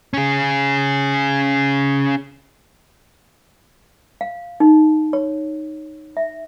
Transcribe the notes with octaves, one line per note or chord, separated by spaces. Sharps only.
C#4 G#4
F5
D#4
C#5
E5